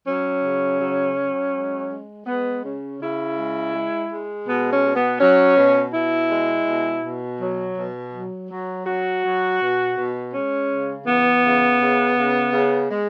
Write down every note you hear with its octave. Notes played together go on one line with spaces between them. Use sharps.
F#3 C#4
C#3
F#3
F#3
G#3
G#3
G#3 B3
C#3 C#4
C#3 E4
G#3
G#3
G#3
B2 B3
C#4
B2
B3
F#3 C#4
B2
B2 E4
G#3
B2
B2
F#3
B2
F#3
F#3
F#3 F#4
F#3
B2
B2
G#3 C#4
C#3
E3 B3
C#3
C#3
C#3
C#3
G#3